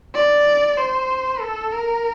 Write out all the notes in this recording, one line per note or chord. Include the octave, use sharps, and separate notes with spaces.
D5
C5
A4
A#4